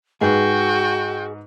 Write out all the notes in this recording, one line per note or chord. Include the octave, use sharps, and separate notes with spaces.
G#2 F#4 G#4 B4 G5